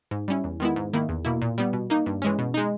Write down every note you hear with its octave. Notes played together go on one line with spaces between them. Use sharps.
G#2
G3 C#4 E4
E2
D#3 G#3 B3 E4
G#2
D#3 A#3 E4
E2
B2 A#3 E4
A#2
G3 B3
B2
A#3 D#4
G2
E3 G#3 C#4
B2
G#3 D#4